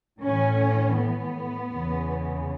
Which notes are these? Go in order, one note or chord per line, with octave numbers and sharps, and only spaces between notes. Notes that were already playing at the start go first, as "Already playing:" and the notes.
A2 E3 C#4
B3
E2 C#3 E3